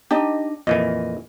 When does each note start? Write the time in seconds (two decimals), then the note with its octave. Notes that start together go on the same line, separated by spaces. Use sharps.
0.11 D4 D#4 G4 D#5
0.67 F2 A#2 E3 D#5